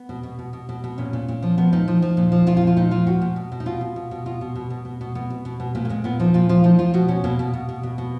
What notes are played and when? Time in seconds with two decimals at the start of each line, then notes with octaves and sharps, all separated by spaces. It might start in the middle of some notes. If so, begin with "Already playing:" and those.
Already playing: B3
0.09 B2
0.23 B2
0.39 B2
0.53 B2
0.69 B2
0.84 B2
0.98 A#2 C#4
1.13 A#2
1.28 A#2
1.43 F3
1.58 F3 B3
1.73 A#2 D#4
1.88 F3
2.02 F3
2.17 A#2
2.32 F3
2.47 A#2 F4
2.57 F4
2.61 F3
2.67 F4
2.77 A#2 D#4
2.91 F3 F4
3.07 A#2 F#4
3.21 A#2
3.36 B2
3.52 B2
3.60 D#4
3.66 B2 F4
3.81 B2
3.96 B2
4.11 B2
4.26 B2 F4
4.41 B2
4.55 B2
4.70 B2
4.85 B2
5.01 B2
5.15 B2 B3
5.30 B2
5.45 B2
5.60 B2
5.75 A#2 A#3
5.85 A#3
5.89 A#2 G#3
6.04 A#2 B3
6.20 F3 D#4
6.34 A#2 F4
6.49 F3 F4
6.64 F3 D#4
6.79 F3 F4
6.94 B2 F#4
7.08 B2 C#4
7.24 B2 A#3
7.39 B2
7.53 B2
7.69 B2
7.83 B2
7.98 B2